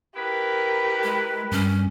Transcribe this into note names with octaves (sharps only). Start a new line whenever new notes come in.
E4 G4 A#4 B4
G#3
G2 C#4